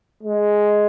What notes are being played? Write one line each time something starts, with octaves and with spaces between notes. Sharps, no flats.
G#3